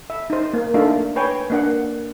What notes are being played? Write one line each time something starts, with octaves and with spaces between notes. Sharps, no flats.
E5
D#4 C5
A#3
A3 D4 D#4 F4 E5
B4 C#5 G5 G#5
A#3 D4 F#5